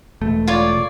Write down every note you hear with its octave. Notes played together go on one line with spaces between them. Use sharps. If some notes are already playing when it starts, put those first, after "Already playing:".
E1 A3
F4 C#5 D5